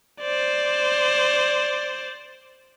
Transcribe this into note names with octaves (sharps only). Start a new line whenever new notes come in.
C5 D5